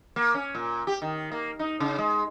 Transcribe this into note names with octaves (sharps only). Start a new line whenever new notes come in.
A#3
C#4
A#2
G4
D#3
A#3
D#4
C#3
G#3